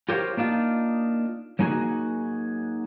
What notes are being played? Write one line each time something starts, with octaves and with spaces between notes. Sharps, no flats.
F4 G4 A#4 C5 C#5 F5
A#3 D4 D#4 F4
F#3 A#3 D#4 F#4 G#4